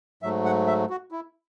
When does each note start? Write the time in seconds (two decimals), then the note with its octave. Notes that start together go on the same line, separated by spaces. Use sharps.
0.22 G#2 F#3 A3 E5
0.45 F#5
0.67 E5
0.90 F#4
1.12 E4